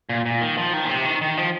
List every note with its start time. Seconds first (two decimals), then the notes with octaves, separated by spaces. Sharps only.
0.09 A#2
0.26 A#2
0.41 D#3
0.58 F3
0.73 D#3
0.85 A#2
0.89 C3
1.05 D#3
1.21 D#3
1.37 F3